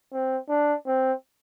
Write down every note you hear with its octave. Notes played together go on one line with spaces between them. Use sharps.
C4
D4
C4